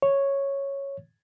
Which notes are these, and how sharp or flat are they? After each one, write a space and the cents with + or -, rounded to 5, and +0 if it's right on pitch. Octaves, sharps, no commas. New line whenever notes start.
C#5 -5